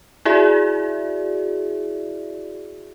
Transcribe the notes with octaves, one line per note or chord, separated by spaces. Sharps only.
E4 F#4 G#4 D5 E5